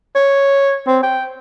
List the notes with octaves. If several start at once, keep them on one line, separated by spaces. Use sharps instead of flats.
C#5
C4
G5